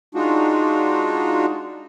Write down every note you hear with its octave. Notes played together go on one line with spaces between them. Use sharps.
G#3 D4 D#4 F4 F#4